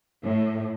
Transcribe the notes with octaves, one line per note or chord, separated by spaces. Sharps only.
A2